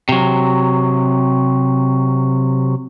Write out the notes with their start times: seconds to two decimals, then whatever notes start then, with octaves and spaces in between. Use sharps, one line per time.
0.09 C3 F#3